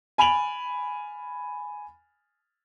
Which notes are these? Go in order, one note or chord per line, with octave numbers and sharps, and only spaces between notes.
G#5 B5 D7 F7 F#7